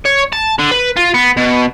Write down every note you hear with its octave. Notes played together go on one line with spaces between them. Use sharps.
C#5
A5
D3
B4
F4
B3
B2